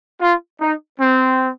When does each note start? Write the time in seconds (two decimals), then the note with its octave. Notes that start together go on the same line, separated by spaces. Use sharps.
0.21 F4
0.60 D#4
1.00 C4